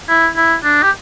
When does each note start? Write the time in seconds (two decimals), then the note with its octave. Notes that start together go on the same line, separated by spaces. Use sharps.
0.09 E4
0.36 E4
0.63 D4
0.82 G4